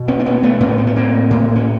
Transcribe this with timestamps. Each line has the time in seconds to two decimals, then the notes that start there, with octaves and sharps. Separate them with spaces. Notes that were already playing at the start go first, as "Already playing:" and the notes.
Already playing: B2
0.08 B3 C#4
0.19 D4
0.26 B3 C#4
0.43 A3 B3
0.60 A2 B3 C#4
0.78 C4
0.87 B3
0.96 A#3 C4
1.31 A2
1.56 C#4